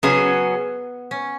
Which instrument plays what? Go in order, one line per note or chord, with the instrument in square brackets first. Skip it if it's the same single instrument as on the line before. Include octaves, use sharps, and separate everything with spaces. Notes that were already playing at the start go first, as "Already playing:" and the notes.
[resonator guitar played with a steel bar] C#3 F#3 C#4 G#4 [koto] B3
[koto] C#4